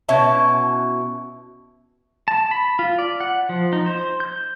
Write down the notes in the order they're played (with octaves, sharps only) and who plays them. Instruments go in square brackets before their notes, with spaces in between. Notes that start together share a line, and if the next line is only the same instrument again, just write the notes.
[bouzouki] B2 C#4 E4 A5
[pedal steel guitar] A5
B5
F4
D5
F#5
F3
D#4
C5
G6